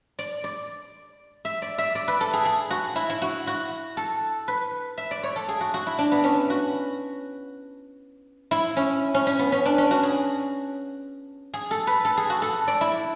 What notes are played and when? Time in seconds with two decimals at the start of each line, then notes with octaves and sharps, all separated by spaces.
0.19 D5
0.44 D5
1.45 E5
1.62 D5
1.78 E5
1.95 D5
2.08 B4
2.21 A4
2.33 G#4
2.45 G#4
2.71 F#4
2.96 E4
3.10 E4
3.22 F#4
3.47 F#4
3.97 A4
4.48 B4
4.98 E5
5.11 D5
5.23 C#5
5.36 A4
5.49 G#4
5.61 F#4
5.74 F#4
5.87 E4
5.99 D4
6.12 B3
6.24 C#4
6.50 F#4
8.51 E4
8.77 C#4
9.14 C#4
9.27 C#4
9.39 B3
9.52 C#4
9.65 D4
9.78 C#4
9.91 F#4
10.03 G#4
11.54 G#4
11.71 A4
11.87 B4
12.05 A4
12.17 G#4
12.30 F#4
12.42 A4
12.68 D5
12.81 E4